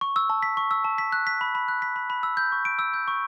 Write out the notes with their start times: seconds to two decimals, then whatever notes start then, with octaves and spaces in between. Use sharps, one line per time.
0.01 C#6
0.16 E6
0.30 A5
0.43 B6
0.57 C#6
0.71 E6
0.84 A5
0.98 B6
1.12 F#6
1.27 B6
1.41 B5
1.55 B5
1.68 F#6
1.82 B6
1.96 B5
2.10 B5
2.23 E6
2.37 G6
2.52 C#6
2.65 D7
2.79 E6
2.94 G6
3.08 C#6